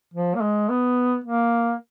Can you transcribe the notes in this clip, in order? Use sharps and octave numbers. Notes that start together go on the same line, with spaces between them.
F3
A#3
G#3
B3
A#3